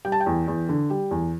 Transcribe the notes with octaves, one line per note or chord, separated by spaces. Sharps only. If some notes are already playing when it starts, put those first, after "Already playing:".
G3 G5
A5
G5
E2
E2
D3
G3
E2